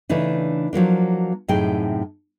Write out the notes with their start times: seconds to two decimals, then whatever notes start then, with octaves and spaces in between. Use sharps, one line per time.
0.09 C#3 E3 A3 D4 D#4
0.73 F3 F#3 A#3 D4
1.48 F#2 A2 C3 D#4 G#4 G5